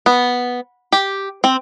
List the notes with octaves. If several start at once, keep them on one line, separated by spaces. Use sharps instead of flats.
B3
G4
C4